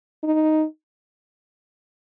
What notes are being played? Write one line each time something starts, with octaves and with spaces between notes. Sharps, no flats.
D#4